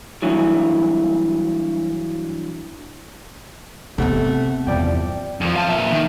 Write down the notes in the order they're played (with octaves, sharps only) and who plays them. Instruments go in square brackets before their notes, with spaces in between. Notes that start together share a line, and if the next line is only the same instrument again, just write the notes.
[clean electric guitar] G2 E3 F#3
[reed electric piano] C3 F#5 [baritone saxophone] A3 [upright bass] B3 C4
[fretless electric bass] E2 G2 C3 [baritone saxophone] F3 [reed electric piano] D5 G5
[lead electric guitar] F2 F3
F5 A5
A#2 E5
D#3